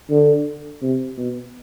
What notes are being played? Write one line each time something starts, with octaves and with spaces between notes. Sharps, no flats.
D3
C3
B2